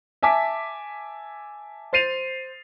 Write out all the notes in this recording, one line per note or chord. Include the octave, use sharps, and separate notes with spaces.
E5 G#5 A5 D6 B6
C5 A6 C7 D#7 F7